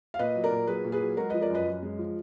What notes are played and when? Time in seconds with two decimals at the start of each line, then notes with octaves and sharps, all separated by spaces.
0.14 F5
0.19 A#2 B4 D#5
0.35 F#3
0.44 A#4 D5
0.51 A#2
0.67 F#3 G#4 B4
0.85 A#2
0.92 G#4 B4
1.00 F#3
1.17 G#3 F#4 A#4
1.30 F3 B4 D#5
1.41 A#4 D5
1.50 F#2 B4 D#5
1.66 F#2
1.83 G#3
1.99 F3